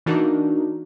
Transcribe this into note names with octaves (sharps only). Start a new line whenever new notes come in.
E3 A#3 D4 D#4 F#4 A#4